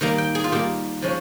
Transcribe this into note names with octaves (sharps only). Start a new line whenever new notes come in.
D#3 G3 A#3 A#5
G5
G#4
F4
D#3 G3 A#3 G4
F3 G#3 C#4